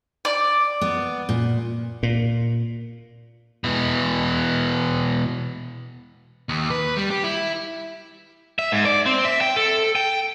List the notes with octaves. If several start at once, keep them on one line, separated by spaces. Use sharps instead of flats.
D5
B3
A#2
A#2
B2 E3
D#2
B4
G3
G4
E4
E5
G#2
D5
C4
E5
G5
A4
G5